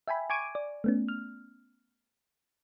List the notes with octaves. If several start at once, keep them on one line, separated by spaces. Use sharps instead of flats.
E5 G5 G#5 B5
G#5 C#6 D6 G#6 D7 D#7
D5
A3 B3 C#4
F6